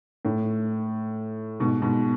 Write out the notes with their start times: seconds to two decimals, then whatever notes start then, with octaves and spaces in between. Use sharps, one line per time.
0.25 A2
1.60 G#2 B2
1.82 G#2 B2